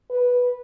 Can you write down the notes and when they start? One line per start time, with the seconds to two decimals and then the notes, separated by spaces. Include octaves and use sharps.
0.10 B4